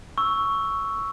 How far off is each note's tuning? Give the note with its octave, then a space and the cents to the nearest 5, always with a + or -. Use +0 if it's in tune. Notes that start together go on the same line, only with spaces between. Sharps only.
C#6 +5 E6 +0